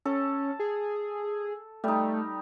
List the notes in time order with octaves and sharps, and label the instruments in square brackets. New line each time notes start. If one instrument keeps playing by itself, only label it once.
[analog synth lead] C#4 [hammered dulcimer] A4
[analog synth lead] G#4
[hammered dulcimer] G3 D#4 [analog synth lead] A3